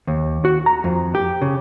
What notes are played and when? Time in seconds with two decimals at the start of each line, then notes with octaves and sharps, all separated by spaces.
0.07 D#2
0.45 F#4
0.66 A#5
0.84 F2
1.15 G4
1.41 C#3